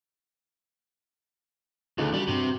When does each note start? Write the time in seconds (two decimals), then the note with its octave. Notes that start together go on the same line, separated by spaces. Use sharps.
1.98 D2 C#3 D#4 F4 A4 B4
2.14 G3 D4 F#4
2.28 G2 C3